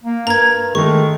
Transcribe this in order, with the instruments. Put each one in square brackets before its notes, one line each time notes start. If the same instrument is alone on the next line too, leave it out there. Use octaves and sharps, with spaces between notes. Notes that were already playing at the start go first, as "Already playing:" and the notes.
[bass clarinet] A#3
[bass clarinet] G2 [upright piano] A#4 [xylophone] A#5 G#6
[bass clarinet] D#3 [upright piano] G#3 A3 [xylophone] C#6